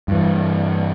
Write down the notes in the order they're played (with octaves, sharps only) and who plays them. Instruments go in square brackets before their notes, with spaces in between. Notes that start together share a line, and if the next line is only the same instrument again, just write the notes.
[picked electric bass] G2 E3